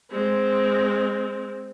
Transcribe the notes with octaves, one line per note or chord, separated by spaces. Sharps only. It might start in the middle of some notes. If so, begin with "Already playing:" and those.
G#3 C4